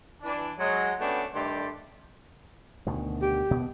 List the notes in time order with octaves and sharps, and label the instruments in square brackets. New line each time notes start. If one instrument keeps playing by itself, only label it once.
[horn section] E3 D4
F#3 G#3
A3 B3 C#4 D4 F#4 G4
G2 D#3 A3 G4 D5 C6
[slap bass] D2 B2 D#3
[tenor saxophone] G4
[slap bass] B2 B3